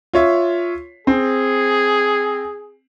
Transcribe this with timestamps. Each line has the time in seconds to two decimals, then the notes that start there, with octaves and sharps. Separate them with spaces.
0.13 F4 C#5 E5
1.07 C4 G#4